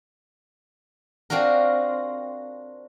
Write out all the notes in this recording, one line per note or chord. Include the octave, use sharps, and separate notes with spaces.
C4 D4 F4 F#4 A#4